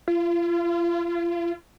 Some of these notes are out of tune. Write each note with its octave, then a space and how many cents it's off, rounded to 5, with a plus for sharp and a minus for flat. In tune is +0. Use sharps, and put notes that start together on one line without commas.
F4 -35